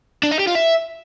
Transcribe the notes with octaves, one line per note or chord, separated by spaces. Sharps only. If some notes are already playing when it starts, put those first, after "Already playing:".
D4
D#4
G4
F4
E5